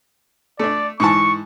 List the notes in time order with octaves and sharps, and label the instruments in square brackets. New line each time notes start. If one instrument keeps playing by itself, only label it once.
[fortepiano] A3 D4 [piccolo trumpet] D5
[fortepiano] G#2 E3 A5 [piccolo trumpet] C#6